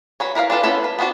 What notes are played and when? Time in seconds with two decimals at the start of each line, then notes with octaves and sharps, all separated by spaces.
0.20 F#3 B4 C#5
0.35 E4 A#4 B4 F5
0.50 D4 F4 A4 B4
0.63 B3 C#4 E4 A4 B4
0.84 B4
0.99 B3 C4 D4 F#4